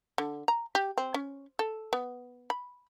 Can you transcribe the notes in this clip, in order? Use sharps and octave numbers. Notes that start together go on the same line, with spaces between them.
D3
A#5
G4
C4
C#4
A4
B3
B5